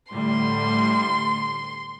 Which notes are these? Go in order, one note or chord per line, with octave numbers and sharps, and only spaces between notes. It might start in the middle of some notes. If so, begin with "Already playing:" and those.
A2 D3 G3 C6